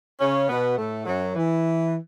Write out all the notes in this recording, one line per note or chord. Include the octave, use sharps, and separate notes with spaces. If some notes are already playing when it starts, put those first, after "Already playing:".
C#3 C#4
B2 B3
A2 A3
F#2 F#3
E3